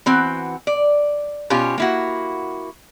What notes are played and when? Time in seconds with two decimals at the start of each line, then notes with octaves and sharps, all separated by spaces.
0.06 E3 C4 F#4
0.67 D5
1.50 B2 C#4 F4 G4
1.78 A#3 E4 F#4